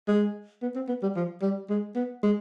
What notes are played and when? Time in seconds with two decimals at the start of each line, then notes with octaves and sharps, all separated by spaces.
0.08 G#3
0.63 B3
0.76 C4
0.89 B3
1.03 G3
1.16 F3
1.42 G3
1.70 G#3
1.96 B3
2.23 G#3